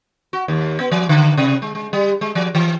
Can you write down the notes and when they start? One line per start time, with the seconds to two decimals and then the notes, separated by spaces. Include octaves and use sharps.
0.33 F#4
0.48 D#2
0.80 B3
0.91 F3
1.09 D3
1.37 C3
1.62 G#3
1.75 G#3
1.93 G3
2.21 G#3
2.35 F3
2.55 E3